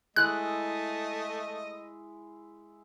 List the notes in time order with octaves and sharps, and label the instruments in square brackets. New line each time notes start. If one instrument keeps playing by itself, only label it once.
[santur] G#3 E4 [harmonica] A3 D#5 [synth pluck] F#6